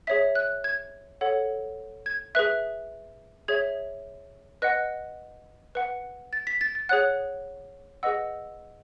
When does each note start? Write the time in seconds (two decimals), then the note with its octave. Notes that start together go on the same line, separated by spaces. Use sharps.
0.07 G#4 C#5 E5 B6
0.35 F#6
0.64 G#6
1.21 A4 C#5 F#5
2.06 G#6
2.35 G#4 B4 E5 F#6
3.48 G#4 C#5 E5 G#6
4.62 B4 D#5 F#5 F#6
5.75 B4 F#5
6.33 A6
6.47 B6
6.61 A6
6.75 A6
6.89 G#4 C#5 F#5 F#6
8.03 G#4 B4 D#5 F#5 E6